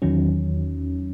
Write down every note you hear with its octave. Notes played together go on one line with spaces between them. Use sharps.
E2 D#3 F#3 C#4